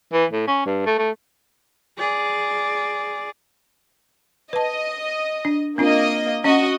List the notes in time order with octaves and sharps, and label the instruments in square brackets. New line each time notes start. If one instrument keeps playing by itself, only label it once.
[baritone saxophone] E3
A2
C#4
G2
A3
A3
[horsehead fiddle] G#4 D5
[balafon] B4 A5 [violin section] D#5
[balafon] D4
[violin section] A#3 D#5 [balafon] C4 D4 F4
[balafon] C#4 [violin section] F#4 D#5